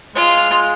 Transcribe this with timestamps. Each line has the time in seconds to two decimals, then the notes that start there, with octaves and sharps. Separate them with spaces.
0.15 G#3 F4
0.50 G#3